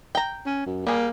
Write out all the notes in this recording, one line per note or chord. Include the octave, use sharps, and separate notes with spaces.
G5 A#5
C#4
F#2
G3 A#3 G#4